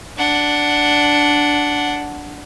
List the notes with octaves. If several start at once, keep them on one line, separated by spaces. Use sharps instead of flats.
D4 F#5